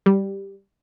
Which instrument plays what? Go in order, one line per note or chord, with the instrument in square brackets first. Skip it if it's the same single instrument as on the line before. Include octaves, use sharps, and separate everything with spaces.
[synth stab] G3